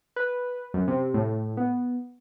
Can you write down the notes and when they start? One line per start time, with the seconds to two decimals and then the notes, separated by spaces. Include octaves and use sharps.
0.16 B4
0.74 F#2
0.88 C3
1.14 A2
1.57 B3